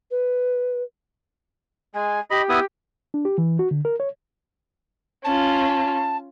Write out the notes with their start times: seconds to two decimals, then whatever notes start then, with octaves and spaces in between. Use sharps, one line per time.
0.11 B4
1.94 G#3 G#5
2.30 G4 D#5 B5
2.49 B3 E4 D#6
3.14 D4
3.25 G4
3.38 E3
3.59 F#4
3.71 D3
3.85 A#4
4.00 C#5
5.24 C#4 F4 A5